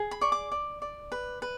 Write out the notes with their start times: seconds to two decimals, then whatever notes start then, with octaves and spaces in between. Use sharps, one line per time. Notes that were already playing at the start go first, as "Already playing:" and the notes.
Already playing: G#4
0.11 B5
0.21 D5 C#6
0.32 D6
0.52 D5
0.82 D5
1.12 B4
1.42 B4